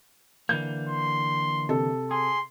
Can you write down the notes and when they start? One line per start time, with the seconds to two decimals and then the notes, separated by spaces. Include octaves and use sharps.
0.49 D3 E3 A#3 G6
0.89 C6
1.69 C3 A4
2.11 G#4 C6